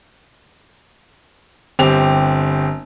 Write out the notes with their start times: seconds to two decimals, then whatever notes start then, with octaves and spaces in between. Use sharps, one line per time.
1.79 G1 C4 G4 F7